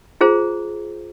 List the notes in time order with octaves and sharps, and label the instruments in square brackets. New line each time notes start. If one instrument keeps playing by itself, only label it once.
[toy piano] F4 G#4 C5 A#5